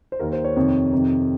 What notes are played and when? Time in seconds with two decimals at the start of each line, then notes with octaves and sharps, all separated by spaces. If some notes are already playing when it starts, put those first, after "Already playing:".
0.12 C5
0.19 D#2 D#3 A#4
0.33 C5
0.44 C#5
0.56 F2 C3 D#3
0.93 F2 C3 D#3